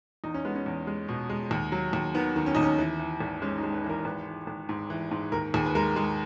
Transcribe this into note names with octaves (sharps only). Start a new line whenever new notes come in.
E2 D#4
C#4
G#3 B3
C#4
E2
G#3
B2
G#3
D#2
F#3
D#2
D#3 B3
D#3
C#4
D#2 D#4
C#4
E3
E3
G#1
G#3 C#4
D#4
G#3
B4
E3
A#4
G#1 B4
E3
G#1
G#2
E3
G#2
D#2 A#4
D#2 G#4
B4
G#3 A#4
G#3